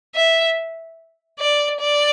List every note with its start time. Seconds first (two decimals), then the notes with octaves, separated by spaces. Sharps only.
0.15 E5
1.40 D5
1.80 D5